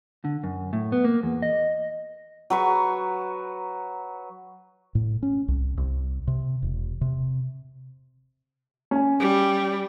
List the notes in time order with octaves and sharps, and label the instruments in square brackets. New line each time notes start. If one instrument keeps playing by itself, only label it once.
[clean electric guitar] D3
F#2
A2
B3
A#3
E2
D#5
[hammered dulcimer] F#3 B4 C#6
[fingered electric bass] A2
C#4
C2
C2
C3
E1
C3
[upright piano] C#4 G#5
[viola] G3